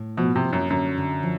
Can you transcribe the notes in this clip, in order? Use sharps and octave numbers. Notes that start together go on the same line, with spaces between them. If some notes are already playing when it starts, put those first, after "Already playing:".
Already playing: A2
B2 F3
C3
A#3
F#2
F#2 D3
D3
F3